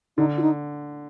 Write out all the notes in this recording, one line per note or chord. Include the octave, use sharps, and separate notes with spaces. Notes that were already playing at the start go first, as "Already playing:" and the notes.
D3 D#4
F4
D#4